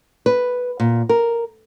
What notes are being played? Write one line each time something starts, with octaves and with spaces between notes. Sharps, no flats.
B4
A#2
A#4